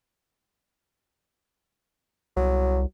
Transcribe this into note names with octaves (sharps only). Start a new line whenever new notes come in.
C2 F#3